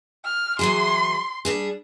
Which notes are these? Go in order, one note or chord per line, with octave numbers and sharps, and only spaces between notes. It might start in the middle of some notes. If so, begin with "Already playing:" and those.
F6
E3 F#3 G#4 C6
G3 D4 G#4